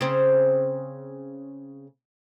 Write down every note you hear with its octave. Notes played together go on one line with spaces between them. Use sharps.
C#3 C4